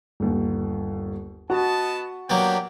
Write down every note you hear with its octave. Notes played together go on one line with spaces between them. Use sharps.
G1 D#2
B3 F#4 D#5 A5
F#3 A#3 B3 D4 G4 G5